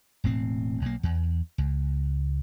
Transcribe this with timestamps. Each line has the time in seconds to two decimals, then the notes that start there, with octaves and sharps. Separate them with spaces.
0.24 E1 A2 C4
0.82 B1 A#3
1.03 E2
1.58 C#2